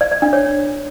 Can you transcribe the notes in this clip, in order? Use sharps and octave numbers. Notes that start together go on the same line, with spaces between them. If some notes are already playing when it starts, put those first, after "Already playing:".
D5
D5
D4
C#5